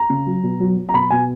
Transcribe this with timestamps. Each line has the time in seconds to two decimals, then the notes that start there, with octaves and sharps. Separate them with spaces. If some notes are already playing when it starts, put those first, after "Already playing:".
Already playing: A#5
0.10 C#3
0.26 F#3
0.43 B2
0.60 F#3
0.77 F#3
0.89 A#5
0.94 B2 B5
1.10 B2 G#5